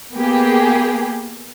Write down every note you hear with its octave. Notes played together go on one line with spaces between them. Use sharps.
A#3 B3 G4 G#4